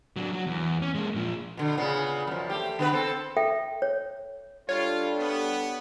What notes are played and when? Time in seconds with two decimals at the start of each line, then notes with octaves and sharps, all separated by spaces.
0.16 F#3 D4
0.33 F#3 F#4
0.47 E2
0.82 C#4
0.95 G#3 A#3
1.15 A#2 F3
1.57 B2 D3
1.77 A#2 C#3 B3
2.27 F#2 F3
2.50 A3 G4
2.79 D3 B3 B4
2.93 C4 A4
3.37 A4 E5 G5
3.82 C#5
4.69 G3 D4 F4 A4 C#5
5.19 B3